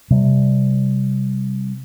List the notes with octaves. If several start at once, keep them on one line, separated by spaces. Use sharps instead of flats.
C3 G3